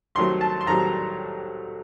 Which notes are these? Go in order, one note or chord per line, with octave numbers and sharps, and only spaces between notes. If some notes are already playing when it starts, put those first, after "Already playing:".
C2 C3 D#3 F#3 A3 C6
A5
C6
C2 C3 D#3 F#3 A3 A#5